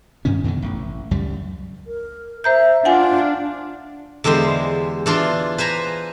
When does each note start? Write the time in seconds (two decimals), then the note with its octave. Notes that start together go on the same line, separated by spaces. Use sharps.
0.25 G2 C3 D#3 C#4
0.44 F#2 B2 D3 D#3
0.62 A1
1.11 C#2 F#2 G3
1.86 A#4
2.44 C5 E5 A#5 G6
2.85 D4 F4 F#5 G#5
4.24 E2 D3 G#3 G4 C5
5.06 E3 D4 F4 C6
5.58 B4 C5 G#5 A#5